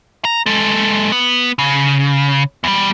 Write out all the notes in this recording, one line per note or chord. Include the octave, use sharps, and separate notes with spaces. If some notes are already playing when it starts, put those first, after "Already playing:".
A#5
G#3 A4
B3
C#3
E2 G3